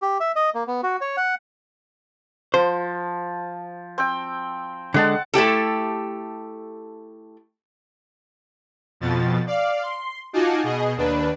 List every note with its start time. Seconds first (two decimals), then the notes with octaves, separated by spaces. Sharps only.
0.02 G4
0.20 E5
0.36 D#5
0.55 A#3
0.67 B3
0.83 F#4
1.01 C#5
1.17 F#5
2.54 F3 C5
3.98 C4 G5
4.94 D3 G#3 F#5 A5
5.34 A3 E4 G4 A4
9.01 F2 B2 F3 A6
9.47 D5 F5
9.83 C6
10.33 D#4 F4 F#4 G#5 A5 D6
10.63 B2 G#4 D#5
10.97 D#2 D4 B4